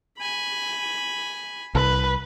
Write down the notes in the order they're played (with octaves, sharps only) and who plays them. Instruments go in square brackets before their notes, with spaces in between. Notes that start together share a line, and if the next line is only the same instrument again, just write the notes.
[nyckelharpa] G#5 B5
[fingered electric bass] C2 [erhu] B4